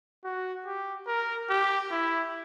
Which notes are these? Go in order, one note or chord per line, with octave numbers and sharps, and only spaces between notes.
F#4
G4
A#4
G4
E4